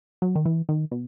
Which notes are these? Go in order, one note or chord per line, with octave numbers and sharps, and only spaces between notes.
F#3
D#3
E3
D#3
B2